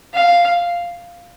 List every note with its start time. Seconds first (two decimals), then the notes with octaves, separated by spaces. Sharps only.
0.14 F5